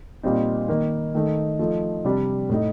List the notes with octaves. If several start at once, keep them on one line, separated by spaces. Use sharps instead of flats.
A#2 G3 C4 D#4
D#3 A#3 D#4
D#3 A3 D#4
F3 A3 D#4
C3 G3 D4
A2 A3 D#4